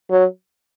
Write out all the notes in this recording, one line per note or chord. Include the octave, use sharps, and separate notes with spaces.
F#3